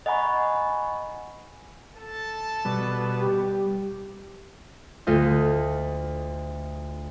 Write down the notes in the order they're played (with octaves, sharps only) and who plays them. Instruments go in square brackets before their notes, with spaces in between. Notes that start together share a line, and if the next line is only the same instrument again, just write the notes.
[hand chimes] D#5 F#5 G#5 A#5 B5 C#6
[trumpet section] A4 A5
[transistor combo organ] B2 [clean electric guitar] G3
[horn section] G4
[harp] D2 A3 F4 D#5